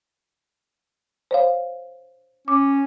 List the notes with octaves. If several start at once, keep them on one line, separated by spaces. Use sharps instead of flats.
C5 C#5 F5
C#4 D6